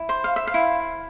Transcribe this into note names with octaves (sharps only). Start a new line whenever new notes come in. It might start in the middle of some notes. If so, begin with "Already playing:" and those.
Already playing: E4
C5
F5
E5
F5
E4